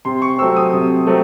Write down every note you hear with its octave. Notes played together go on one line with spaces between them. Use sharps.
C3 C6
C#6
F#3 A3 C4 E6
D#6
C3
F#3 A3 C4